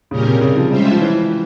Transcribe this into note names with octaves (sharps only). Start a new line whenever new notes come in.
A#2 C#3 G3 C#4 G4 A#4
C3
C#3
F3
G3 G#3 C#4 F4 C5 E5
G3
F3
E3